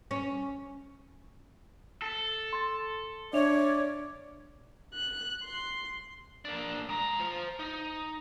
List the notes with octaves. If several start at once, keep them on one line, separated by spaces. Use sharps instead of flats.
C#4
A4
C6 A6
D4 C#5 D5 E5 F7
F#6
C6
A#3 D4
G#3 A#5
F4 C5
D#4